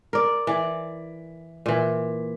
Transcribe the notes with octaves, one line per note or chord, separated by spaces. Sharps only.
A#4 D5
E3 D5
A#2 E3